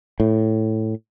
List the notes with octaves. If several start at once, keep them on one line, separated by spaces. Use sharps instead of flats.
A2